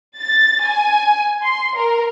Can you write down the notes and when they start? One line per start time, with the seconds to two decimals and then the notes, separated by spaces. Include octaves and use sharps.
0.19 A6
0.66 G#5
1.45 C6
1.76 A#4